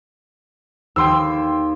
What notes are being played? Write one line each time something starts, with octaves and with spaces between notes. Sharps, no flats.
D#2 G5 C6 E6